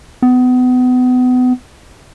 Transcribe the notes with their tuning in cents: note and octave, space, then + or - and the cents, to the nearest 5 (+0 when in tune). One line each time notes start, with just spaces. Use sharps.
B3 +30